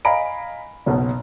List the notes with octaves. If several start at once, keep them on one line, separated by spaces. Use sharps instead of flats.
D#5 F5 G#5 A#5 B5 D7
F#1 B1 B2